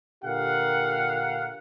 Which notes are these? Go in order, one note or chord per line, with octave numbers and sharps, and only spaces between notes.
A#2 D3 G4 A#4 F5 F#5